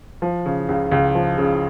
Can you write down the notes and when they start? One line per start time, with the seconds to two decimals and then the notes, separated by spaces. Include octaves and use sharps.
0.22 F3
0.46 C#3
0.69 C#2
0.92 C#2
1.15 F3
1.38 C#3